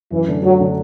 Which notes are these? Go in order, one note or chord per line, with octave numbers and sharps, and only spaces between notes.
F#2 E3
D3 A3 D4
F#2 F#3
D3 A3 D4